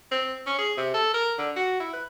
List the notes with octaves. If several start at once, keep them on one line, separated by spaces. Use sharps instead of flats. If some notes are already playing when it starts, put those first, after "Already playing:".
C4
C#4
G#4
C3
A4
A#4
D3
F#4
E4
B4